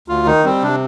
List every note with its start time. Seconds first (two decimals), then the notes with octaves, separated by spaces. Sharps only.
0.08 D2 F4
0.26 D#3 D#4
0.44 G3 C4
0.62 C3 D4